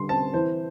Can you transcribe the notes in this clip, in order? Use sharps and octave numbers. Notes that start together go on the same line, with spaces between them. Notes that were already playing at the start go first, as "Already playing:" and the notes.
Already playing: D3 G3 C6
C4 A5
E3 C5